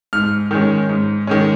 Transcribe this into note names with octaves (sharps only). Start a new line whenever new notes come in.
G#2 F6
D#3 G#3 C#4
G#2
D#3 G#3 C#4